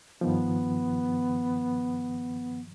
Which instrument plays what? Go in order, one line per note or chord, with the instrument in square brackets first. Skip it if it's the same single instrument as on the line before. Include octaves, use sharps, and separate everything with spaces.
[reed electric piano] G2 D#3 F3 [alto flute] B3